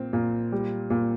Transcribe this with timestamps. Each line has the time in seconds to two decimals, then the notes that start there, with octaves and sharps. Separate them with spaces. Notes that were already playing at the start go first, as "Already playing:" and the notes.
Already playing: A#2 C4
0.13 A#2
0.52 G3
0.90 A#2